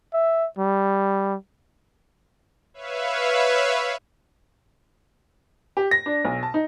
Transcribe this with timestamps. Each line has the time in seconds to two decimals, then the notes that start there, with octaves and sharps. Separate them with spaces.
0.14 E5
0.58 G3
2.74 B4 C#5 E5 F5
5.77 G4
5.91 A#6
6.06 D4
6.25 B1
6.43 A5
6.54 D#4